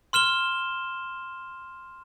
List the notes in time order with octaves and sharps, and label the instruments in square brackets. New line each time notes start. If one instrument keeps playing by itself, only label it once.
[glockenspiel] C6 F6 E7 G7